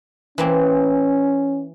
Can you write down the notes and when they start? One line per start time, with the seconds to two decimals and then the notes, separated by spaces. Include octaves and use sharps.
0.38 E3 A#3 C4 C#4